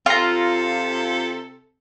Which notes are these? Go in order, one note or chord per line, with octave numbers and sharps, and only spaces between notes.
C3 F4 A4 A#5